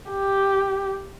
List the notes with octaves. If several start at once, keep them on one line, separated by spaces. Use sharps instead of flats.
G4